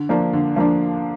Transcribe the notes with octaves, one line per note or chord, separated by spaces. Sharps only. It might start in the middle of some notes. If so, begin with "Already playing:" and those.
Already playing: D3
F3 A#3 D4
D3
F3 A#3 D4